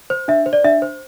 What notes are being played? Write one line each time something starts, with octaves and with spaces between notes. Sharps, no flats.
C5
D4 E5
C5
D5
D4 E5
C5